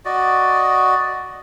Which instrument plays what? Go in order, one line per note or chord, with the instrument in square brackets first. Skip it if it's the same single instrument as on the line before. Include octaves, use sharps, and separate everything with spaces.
[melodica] F#4 D5 D#5